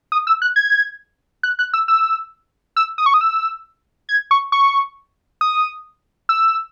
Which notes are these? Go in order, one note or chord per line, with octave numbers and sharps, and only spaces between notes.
D#6
E6
F#6
G#6
F#6
F#6
E6
E6
E6
D#6
C#6
D#6
E6
G#6
C#6
C#6
D#6
E6